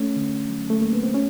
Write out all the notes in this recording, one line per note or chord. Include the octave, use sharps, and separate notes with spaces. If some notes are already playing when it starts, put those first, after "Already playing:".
Already playing: A3 C#4
D3
F#3
A3
A3 A#3
B3
C4
C#4